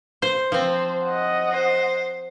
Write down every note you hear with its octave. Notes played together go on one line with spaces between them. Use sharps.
C5
F3 C4 C5
D#5 F#5
C5